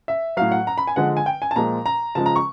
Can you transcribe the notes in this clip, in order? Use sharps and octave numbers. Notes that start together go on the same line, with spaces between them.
E5
A2 F#3 F5
F#5
A#5
B5
G#5
D3 F3 G#3 F#5
G#5
G5
G#5
A5
A#2 F3 G#3 A#5
A#5
C#3 F3 G#3 A5
A#5
C#6